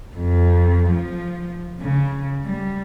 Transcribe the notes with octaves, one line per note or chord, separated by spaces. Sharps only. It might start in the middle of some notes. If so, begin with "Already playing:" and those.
F2
F3
C#3
G3